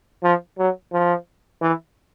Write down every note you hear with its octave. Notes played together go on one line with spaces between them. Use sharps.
F3
F#3
F3
E3